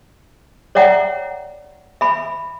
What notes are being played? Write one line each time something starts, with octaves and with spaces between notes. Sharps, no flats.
C#5 D5 E5 F#5 G5 A#5
E5 B5